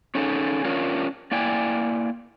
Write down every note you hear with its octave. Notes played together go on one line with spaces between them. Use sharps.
C#4 D#4 G#4 A4
C#4 D4 F4 A#4 C#5
A#3 E4 D5 G5 G#5